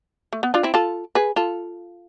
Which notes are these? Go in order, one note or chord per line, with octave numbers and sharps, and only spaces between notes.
A3
B3
D4 F4
C4 E4
F4 A4
G#4 B4
F4 A4